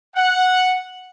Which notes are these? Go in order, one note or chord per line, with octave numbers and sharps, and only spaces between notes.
F#5